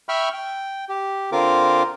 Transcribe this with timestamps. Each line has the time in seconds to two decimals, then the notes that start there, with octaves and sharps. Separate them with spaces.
0.09 E5 G5 B5 C#6 F6
0.33 G5
0.89 G4
1.32 D3 C4 F4 A#4 D6